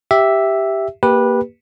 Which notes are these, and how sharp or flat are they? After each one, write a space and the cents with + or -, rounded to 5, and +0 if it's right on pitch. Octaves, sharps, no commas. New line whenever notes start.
G4 +0 E5 +0
A#3 +0 G4 +10 B4 -15